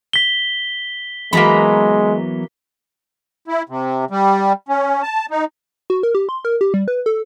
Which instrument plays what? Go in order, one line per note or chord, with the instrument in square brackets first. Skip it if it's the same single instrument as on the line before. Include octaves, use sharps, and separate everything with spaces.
[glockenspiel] B6 G7
[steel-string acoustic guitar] E3 F#3 B3 [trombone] G#3 [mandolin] A#3 A#5 B5
[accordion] E4
C3
G3
C#4
A5
D#4
[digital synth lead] F#4
A#4
G4
C6
A#4
G4
G3
B4
A4